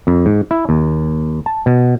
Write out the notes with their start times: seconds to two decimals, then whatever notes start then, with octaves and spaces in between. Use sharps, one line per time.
0.07 F2
0.26 G#2
0.51 E4
0.69 D#2
1.46 A5
1.66 B2